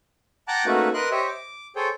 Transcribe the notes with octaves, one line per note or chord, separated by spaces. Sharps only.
F#5 G5 A5 A#5 D6 F#6
A3 A#3 C#4 D#4 F#4 B4
A#4 B4 D#5 C6 F#6
G4 C5 C#5 D#5 E5
D6
G#4 A4 C5 C#5 G5